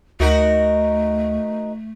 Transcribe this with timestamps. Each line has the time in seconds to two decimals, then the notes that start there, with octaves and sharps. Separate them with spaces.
0.20 D2 A3 D#4 F#4 A#4